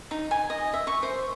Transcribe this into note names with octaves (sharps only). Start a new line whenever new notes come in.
D#4
G#5
D#5
E5
C#6
C5